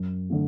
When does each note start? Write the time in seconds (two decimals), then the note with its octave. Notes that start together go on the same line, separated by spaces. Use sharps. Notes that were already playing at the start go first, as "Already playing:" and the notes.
Already playing: F#2
0.30 D3 A3